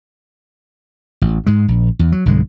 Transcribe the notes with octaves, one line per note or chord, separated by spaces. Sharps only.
A1
G#2 G#3
A#1
E2
F#3
B1 G2 D3 G#3